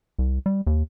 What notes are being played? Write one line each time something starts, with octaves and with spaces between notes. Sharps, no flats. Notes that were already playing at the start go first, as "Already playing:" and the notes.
C2
G3
D#2